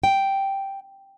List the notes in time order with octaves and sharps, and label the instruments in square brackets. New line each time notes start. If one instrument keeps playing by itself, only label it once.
[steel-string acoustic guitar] G5